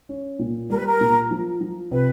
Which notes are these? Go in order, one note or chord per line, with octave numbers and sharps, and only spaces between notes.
C#4
A#2
G3 A#4
B4
A#4
A#2
F3
F3
C3 B4